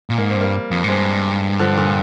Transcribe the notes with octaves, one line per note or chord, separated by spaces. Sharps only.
A#2
G#2 A#3
C4
G2 G3 A#3
F2
G#2
G2 G#3 C4
D3 F3
A#2 D3